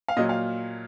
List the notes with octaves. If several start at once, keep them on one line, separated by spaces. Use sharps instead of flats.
F5
A#2 F#3 D#5
F5